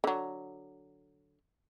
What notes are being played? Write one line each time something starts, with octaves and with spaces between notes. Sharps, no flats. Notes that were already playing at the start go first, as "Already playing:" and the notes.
D3 F#3